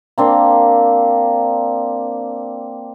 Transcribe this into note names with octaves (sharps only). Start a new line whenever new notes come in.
A#3 C4 D4